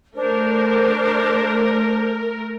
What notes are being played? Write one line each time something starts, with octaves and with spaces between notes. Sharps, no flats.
A3 D4 A#4 C5